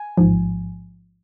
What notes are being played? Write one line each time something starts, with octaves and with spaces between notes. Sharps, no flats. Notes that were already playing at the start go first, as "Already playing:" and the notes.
Already playing: G#5
A1 G#2 F3